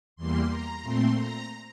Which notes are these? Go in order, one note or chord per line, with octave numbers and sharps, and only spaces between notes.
E2 E3 G3 A#3 C6
A#5
A#2 A3 C4 C6
A#5